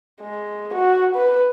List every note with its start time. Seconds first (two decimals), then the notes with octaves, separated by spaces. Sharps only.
0.21 G#3
0.74 F#4
1.15 B4